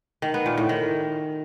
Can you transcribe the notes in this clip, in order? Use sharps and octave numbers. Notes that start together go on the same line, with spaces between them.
D#3
B3
A#2
A2
D#3